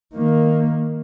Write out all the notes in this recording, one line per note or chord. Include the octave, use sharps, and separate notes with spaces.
D#3 A#3